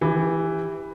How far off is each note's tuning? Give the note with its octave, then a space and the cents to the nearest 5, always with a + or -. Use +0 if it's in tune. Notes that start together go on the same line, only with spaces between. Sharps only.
E3 +0 G4 +15